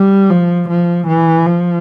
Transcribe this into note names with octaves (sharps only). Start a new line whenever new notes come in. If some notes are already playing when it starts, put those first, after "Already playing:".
Already playing: G3
F3
F3
E3
F3